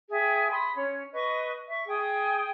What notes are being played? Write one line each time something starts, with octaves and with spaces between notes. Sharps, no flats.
G#4 E5 G5
B5 C6 D#6
C#4 C#5
B4 D#5 C#6
E5 C#6
G#4 G5 D#6